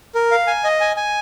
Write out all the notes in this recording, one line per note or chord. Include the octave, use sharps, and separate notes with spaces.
A#4
F5
G#5
D#5
G#5
G#5